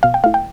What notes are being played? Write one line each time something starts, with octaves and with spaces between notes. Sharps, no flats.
B2 F5
G5
A3 E4 F5
G5